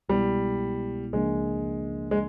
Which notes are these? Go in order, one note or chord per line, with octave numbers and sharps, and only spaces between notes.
C2 B2 G3 G#3 B3 E4
C#2 C#3 F3 G#3 A#3 D4
G#3